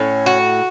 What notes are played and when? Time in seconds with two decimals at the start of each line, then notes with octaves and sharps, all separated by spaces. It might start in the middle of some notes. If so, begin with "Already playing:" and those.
Already playing: A2 C#4
0.26 F#4